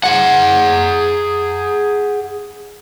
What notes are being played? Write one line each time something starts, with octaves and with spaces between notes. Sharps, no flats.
G#4 F#5